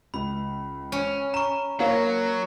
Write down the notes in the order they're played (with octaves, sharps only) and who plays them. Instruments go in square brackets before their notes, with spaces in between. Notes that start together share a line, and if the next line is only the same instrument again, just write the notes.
[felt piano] C#2 [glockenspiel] B5
[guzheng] C#4
[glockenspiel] A#5 C#6 [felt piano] E7
[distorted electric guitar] F#3 [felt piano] A#3 C#5 F5